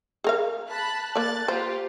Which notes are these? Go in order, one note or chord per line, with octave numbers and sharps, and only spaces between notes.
G#4 A#4 F5
A5 B5 F#6
A#3 D5 F#6 A6
F4 G4 C5